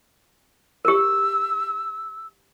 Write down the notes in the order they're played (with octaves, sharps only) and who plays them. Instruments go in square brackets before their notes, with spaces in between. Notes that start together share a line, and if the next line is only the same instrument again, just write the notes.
[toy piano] G4 A#4 [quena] E6